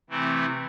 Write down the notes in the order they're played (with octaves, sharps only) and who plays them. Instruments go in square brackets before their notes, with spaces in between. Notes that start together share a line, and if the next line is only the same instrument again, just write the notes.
[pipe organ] C3 E3 A3 C4 E4